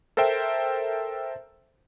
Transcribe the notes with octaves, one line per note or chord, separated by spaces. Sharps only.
A4 A#4 C5 E5 G5